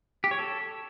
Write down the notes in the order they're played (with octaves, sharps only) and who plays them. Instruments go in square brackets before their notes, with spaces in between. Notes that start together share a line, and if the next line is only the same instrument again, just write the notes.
[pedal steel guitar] G4
C#5
A4